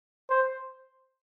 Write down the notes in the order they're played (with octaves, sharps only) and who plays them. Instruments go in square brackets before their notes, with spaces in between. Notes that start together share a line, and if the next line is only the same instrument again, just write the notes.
[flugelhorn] C5